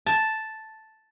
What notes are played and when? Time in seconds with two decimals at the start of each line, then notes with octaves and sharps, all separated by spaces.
0.06 A5